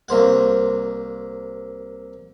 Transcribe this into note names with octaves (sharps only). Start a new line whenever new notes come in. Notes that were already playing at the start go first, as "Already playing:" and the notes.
C2 A#3 C5 F#5